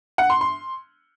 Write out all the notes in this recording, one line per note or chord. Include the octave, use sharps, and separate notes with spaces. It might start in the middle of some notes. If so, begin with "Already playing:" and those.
F#5
C6
C6